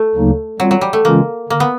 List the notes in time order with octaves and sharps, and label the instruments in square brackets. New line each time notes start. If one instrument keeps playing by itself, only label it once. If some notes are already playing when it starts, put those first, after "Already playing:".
Already playing: [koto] A3
[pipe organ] D2 C#3 F#3 A#3 D#4
[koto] F#3 [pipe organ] G3 C4 F4
[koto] F#3
G3
A3
[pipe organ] C#3 E3 G#3 C#4 F4 [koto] A#3
[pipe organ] D3 [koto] A#3
[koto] B3